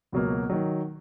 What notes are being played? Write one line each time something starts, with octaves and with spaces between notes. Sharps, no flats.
C#2 B2 F#3 A#3
D#3 F#3